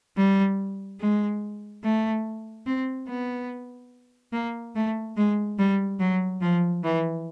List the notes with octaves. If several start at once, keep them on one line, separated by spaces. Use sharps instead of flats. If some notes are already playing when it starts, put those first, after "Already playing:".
G3
G#3
A3
C4
B3
A#3
A3
G#3
G3
F#3
F3
E3